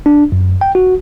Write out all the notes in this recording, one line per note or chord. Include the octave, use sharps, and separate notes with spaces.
D4
F#2
G5
F#4